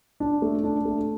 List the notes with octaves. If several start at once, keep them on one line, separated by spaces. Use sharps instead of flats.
D4
A3
D4
A3